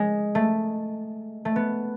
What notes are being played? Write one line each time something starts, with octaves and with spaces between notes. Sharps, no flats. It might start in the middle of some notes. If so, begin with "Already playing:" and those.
Already playing: G#3
A3
A3
B3